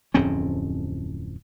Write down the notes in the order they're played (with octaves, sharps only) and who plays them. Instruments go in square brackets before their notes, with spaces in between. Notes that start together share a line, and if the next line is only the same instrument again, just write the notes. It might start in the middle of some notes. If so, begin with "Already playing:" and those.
[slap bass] D1 F2 C4 C#4